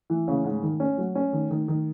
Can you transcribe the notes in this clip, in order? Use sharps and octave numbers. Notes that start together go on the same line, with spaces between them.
E3
C#3
G#2
D#3
C#4
F#3
C#4
D#3
D#3
D#3